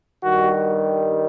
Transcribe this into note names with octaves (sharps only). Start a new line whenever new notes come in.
G2 D#3 G3 F#4